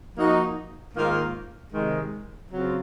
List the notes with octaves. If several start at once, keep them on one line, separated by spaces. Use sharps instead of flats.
F3 A#3 D#4 F#4
G#2 D#3 A#3 F4
C3 D#3 G#3
C#3 F#3 C4 F4